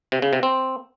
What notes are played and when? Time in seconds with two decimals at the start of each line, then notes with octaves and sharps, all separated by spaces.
0.12 C3
0.22 C#3
0.33 C3
0.43 C4